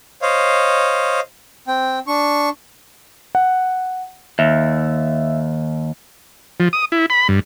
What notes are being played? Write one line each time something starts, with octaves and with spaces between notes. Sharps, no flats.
C5 C#5 D#5 F5
C4 G5
D4 C#6
F#5
D#2 E5
F3
D#6
E4
B5
G2